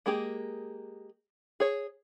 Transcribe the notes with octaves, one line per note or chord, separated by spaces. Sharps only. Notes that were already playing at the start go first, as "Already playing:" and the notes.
G#3 A#3 G4 G#4
G#4 C#5